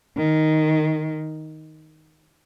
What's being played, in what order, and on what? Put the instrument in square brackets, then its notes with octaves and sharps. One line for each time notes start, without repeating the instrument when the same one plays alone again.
[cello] D#3